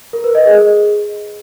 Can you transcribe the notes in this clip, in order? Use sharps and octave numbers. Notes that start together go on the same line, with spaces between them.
A#4
B4
D#5
G#4